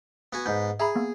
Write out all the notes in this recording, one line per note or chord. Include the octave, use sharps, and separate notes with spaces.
B3 F#4 G#5
G#2 B3 G6
G#4 E5 A#5 B5
A#3 B3